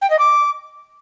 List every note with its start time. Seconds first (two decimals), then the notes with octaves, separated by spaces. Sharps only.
0.01 G5
0.10 D#5
0.18 D6